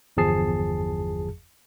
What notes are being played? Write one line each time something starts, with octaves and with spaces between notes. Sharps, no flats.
G1 E2 F3 G#4 A5 C7